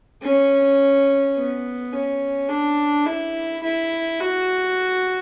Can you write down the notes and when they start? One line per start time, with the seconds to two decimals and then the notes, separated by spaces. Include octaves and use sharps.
0.23 C#4
1.36 B3
1.92 C#4
2.49 D4
3.07 E4
3.63 E4
4.20 F#4